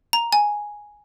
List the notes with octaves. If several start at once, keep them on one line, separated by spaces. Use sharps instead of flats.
A#5
G#5